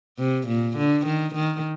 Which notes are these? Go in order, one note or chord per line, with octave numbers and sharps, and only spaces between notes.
C3
A#2
D3
D#3
D#3